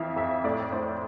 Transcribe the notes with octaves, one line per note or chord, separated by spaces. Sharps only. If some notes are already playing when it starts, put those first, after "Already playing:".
Already playing: F2 E3 E5 F5
F2 E5
A2 D5
A2 C5